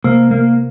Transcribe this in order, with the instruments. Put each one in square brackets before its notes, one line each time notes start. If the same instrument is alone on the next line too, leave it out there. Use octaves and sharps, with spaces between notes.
[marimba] C3 [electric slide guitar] A#3
[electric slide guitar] A#3